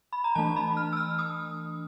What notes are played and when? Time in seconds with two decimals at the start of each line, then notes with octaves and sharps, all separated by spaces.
0.13 B5
0.24 A#5
0.35 E3 A3 D4 A5
0.56 B5
0.77 F6
0.93 E6
0.97 F6
1.19 D#6